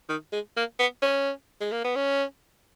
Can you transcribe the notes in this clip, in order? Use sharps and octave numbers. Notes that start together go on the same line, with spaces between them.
D#3
G#3
A#3
B3
C#4
G#3
A#3
B3
C#4